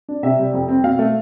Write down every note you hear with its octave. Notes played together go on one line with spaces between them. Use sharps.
D4
C3 E5
G3
F2
C4
B2 F5
A3